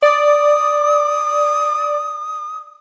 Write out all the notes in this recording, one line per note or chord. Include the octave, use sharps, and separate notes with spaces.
D5 D#6